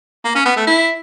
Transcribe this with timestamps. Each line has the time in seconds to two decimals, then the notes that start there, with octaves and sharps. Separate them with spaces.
0.24 A#3
0.35 C#4
0.46 B3
0.56 A3
0.67 E4